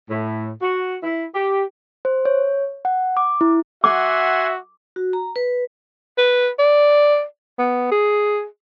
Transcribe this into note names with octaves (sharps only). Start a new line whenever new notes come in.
A2
F#4
E4
G4
C5
C#5
F#5
D6
E4
F#4 E5 F#5 G#5 C6 D6
F#4
A#5
B4
B4
D5
B3
G#4